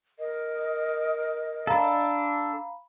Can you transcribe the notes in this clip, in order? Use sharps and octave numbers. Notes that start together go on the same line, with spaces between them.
A#4 D#5
D4 A4 F5 A#5 B5